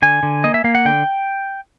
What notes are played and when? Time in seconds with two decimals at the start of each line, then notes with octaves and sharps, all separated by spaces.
0.02 D3 G#5
0.23 D3
0.44 A#3 D#5
0.54 E5
0.64 A#3 F5
0.75 F#5
0.85 D3 G5